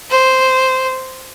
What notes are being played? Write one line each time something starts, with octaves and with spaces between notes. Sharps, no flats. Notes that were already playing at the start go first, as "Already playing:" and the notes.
C5